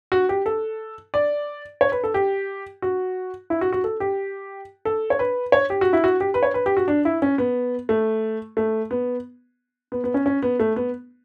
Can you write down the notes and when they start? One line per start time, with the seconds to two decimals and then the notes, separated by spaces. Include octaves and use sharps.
0.12 F#4
0.29 G4
0.46 A4
1.14 D5
1.81 C#5
1.92 B4
2.04 A4
2.14 G4
2.82 F#4
3.50 E4
3.61 F#4
3.73 F#4
3.84 A4
4.00 G4
4.85 A4
5.10 C#5
5.19 B4
5.52 C#5
5.70 G4
5.81 F#4
5.93 E4
6.04 F#4
6.21 G4
6.34 B4
6.43 C#5
6.54 B4
6.66 G4
6.77 F#4
6.88 D4
7.05 E4
7.22 C#4
7.38 B3
7.89 A3
8.57 A3
8.91 B3
9.92 B3
10.04 B3
10.14 C#4
10.26 C#4
10.42 B3
10.60 A3
10.76 B3